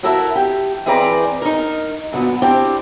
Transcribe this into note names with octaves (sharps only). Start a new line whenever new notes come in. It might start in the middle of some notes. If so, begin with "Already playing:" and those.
E4 F#4 A4 A#4 E5
G4
E3 C4 G#4 B4 D5 A#5
D#4 A#4
A#2 D3 F#3 B3
C4 D4 E4 G4